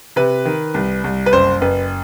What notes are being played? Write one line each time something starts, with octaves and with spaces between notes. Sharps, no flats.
C3 B4
D#3
C2
C2
B4
F#1 C5
F#1 B4